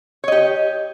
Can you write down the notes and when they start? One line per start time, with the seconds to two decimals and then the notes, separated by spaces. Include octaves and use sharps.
0.24 C#5
0.28 D#5
0.32 G4